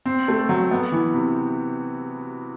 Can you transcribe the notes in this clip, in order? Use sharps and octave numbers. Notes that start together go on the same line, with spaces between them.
C4
A3
F#3
B3
E3
C3